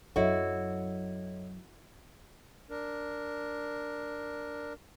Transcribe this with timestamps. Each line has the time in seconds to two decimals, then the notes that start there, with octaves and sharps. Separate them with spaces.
0.16 F#2 F#3 E4 F#4 A4 C#5 D#5
2.70 D4 A#4